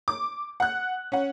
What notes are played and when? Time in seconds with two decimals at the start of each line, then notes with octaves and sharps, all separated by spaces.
0.08 D6
0.60 F#5 F#6
1.12 C#4 F#5